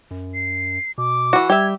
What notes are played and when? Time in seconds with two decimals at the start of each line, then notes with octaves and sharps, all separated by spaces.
0.11 F#2
0.34 C7
0.98 B2 D6
1.33 E3 F#4
1.50 G3 G4 E5 G#6